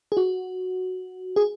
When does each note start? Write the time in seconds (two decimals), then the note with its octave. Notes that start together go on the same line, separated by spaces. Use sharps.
0.12 G#4
0.17 F#4
1.36 G#4